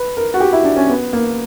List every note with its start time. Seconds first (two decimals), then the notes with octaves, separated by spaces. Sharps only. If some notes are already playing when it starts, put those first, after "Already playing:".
Already playing: B4
0.17 A#4
0.34 F#4
0.40 G4
0.53 E4
0.64 D4
0.76 C#4
0.89 B3
1.13 A#3